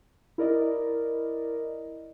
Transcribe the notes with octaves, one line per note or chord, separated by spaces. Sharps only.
E4 A#4 D5 D#5